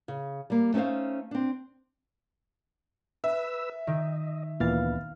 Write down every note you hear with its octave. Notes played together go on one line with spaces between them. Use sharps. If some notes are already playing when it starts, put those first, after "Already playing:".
C#3
G3 A#3
A3 C#4 D#4 C5 F5
C4 D4
B4 E5 E6
D#3 D#5
D2 A#2 E3 B3 F5 A6